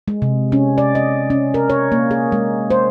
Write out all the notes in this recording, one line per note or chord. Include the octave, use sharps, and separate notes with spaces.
G#3
C3
C#4
D5
D#5
C#4
A#4
C#5
A#3
G#4
G#3
C5